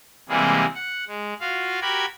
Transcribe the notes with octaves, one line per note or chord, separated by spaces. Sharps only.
C3 E3 G3 G#3 A#3 G#4
F#5
G#3
F4 F#4 F5
F#4 G4 A#4 B5 G#6